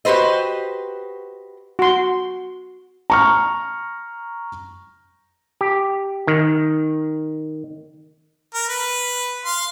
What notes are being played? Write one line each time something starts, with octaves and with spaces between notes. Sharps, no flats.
F#4 G4 B4 C5 D#5
F#4 C6
A#5 C#6 F6
G4
D#3
A#4
B4
F5 C6